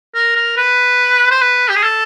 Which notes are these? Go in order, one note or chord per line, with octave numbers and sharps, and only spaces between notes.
A#4
A#4
B4
C5
B4
G4
G#4
A4